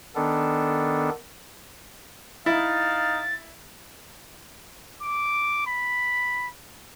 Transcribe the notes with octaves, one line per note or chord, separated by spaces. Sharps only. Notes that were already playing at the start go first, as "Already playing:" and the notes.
D#3 B3 D4 A4
D#4 E4 F5 A6
D6
B5